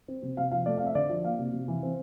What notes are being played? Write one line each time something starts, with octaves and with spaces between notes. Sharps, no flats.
C4
C3
C3 F5
F3 F5
A3 D5
C4 F5
E5
D3 D5
F3
A#3 F5
C3
C3
E3
C4